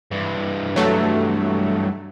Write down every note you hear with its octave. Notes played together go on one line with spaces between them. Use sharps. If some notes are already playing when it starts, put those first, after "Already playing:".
G2 E3
F#3 A3